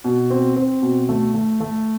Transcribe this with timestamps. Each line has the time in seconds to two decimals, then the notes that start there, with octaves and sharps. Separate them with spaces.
0.04 B2
0.30 C4
0.56 C4
0.82 B2
1.09 A3
1.34 A3
1.60 A3